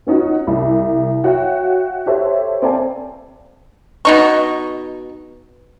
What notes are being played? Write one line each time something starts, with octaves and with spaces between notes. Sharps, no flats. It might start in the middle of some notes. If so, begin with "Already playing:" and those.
B3 C#4 D#4 F4 F#4
C2
F#4 C#5 E5 F5 G5
G4 A4 C5 C#5 E5
C4 A4 D5 F5 G#5 A5
B2 D#4 C#6